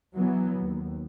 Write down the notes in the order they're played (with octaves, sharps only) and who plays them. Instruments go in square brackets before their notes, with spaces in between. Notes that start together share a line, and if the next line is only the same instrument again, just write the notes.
[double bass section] E3 F#3 B3
D#2